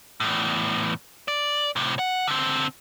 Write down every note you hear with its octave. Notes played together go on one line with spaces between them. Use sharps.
E2 A2
D5
A2 C3
F#5
D3 C4